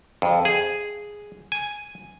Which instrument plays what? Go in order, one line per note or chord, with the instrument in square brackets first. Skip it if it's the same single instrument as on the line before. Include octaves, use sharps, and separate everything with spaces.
[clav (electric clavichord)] F2
G#4
G#5